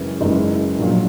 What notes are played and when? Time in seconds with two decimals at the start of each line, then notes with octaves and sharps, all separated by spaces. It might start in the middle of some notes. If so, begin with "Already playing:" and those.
Already playing: F#1 F#2 E3 G#3 C#4
0.21 F#1 F#2 E3 G#3 D#4
0.79 A#1 A#2 F#3